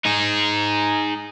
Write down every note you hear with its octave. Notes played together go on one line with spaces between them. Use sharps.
D#4 G#4